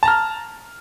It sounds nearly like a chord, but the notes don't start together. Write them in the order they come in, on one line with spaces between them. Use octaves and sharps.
A5 A#5 F6